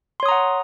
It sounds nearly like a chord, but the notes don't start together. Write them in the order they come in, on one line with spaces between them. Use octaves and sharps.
C6 C#5 D#6 A#5 F#5